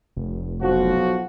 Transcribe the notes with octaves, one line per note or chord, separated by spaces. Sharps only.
F1
B1 F3 F#4